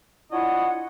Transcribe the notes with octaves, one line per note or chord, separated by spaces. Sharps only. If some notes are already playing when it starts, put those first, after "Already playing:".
D4 E4 F4 C#5 D#5 F#5